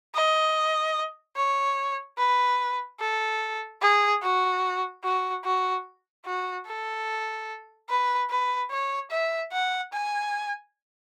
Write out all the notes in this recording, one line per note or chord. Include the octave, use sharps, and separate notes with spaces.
D#5
C#5
B4
A4
G#4
F#4
F#4
F#4
F#4
A4
B4
B4
C#5
E5
F#5
G#5